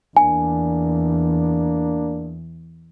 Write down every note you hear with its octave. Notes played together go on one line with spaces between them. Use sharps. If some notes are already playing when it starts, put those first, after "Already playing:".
E2 A#3 D4 G#5